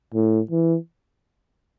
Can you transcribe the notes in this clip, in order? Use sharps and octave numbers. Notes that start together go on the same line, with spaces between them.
A2
E3